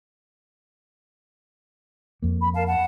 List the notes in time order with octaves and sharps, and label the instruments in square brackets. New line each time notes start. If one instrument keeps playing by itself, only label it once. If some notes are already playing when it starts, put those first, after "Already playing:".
[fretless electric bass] F2 A#3
[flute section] B5
A#4 F5 A5
F#5 A5